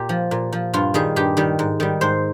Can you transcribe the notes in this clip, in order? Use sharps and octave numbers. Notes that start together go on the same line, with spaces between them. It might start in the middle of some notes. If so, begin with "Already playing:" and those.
Already playing: A#2 G4
F3
A#2
F3
G2 F4
D#3 G3 G#4
G2 G4
D#3 G3
G#2
D#3 G3
G#2 C5